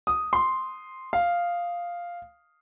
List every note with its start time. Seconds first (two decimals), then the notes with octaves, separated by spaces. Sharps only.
0.07 D#6
0.33 C6
1.13 F5